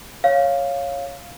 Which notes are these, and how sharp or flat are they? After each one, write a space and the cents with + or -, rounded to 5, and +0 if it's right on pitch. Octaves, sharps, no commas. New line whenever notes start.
C#5 +0 F5 +0